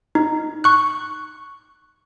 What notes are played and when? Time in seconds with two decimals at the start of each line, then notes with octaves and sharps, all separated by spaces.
0.15 D#4
0.64 C#6 F#6